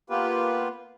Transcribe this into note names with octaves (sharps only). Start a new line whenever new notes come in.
A#3 B3 F4 G4 B4